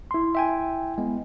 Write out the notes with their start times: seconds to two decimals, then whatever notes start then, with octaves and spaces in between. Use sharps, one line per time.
0.11 E4 C6
0.35 E5 G5 G#5
0.98 G#3 B3